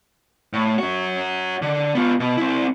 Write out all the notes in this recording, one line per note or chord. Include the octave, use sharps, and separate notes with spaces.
A2
C#4 F#4
D3
B3 F4
B2
C4 E4